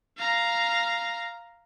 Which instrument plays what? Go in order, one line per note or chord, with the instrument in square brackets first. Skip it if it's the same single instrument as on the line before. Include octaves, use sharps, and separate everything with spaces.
[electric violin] F5 A#5